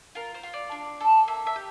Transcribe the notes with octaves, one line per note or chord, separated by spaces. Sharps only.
F4 A#4
C5
F4
D5
D4
A4
A#3 E5
E5
G4